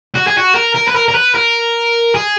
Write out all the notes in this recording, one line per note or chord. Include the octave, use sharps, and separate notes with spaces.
F#4
G#4
F#4
A#4
A#4
B4
A#4
A#4
B4
A#4
G#4